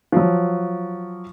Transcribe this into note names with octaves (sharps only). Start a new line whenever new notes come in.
F3 F#3